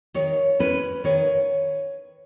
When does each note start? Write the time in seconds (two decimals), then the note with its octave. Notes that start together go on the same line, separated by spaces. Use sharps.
0.14 D#3 C#5
0.59 G#3 C#4 E4 B4
1.04 D#3 C#5